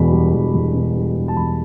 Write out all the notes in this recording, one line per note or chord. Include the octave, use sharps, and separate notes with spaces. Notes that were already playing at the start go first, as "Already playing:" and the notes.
Already playing: E1 E2 B2 B5
G3
E1
E2
B2
G3
E1
A5
E2 B5